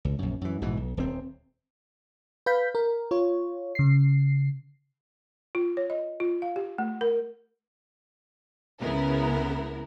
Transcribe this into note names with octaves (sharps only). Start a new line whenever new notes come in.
C#2
A#1 F#2
F#2 E3
A#1 G#2 B2 E3
B1
D#1 C4
B4 F5 G6 B6
A#4
F4 C#5
C#3 C7
F4
C#5
D#5
F4
F5
G4
A3
A#4
C#2 C#3 B3 E4 A#4